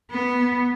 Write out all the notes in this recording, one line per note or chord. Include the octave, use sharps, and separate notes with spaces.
B3